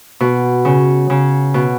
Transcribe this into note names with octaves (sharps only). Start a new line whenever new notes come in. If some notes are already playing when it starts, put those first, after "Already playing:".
B2
C#3
C#3
B2